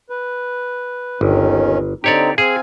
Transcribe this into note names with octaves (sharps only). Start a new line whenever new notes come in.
B4
G1 D#2 D#3 C#4
D3 C4 D#4 G4 C#5 D5
C4 G#4 F5 G#5